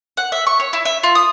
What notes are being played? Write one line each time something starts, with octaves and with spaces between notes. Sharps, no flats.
F#5
E5
C#6
C#5
E4
E5
F4
D#6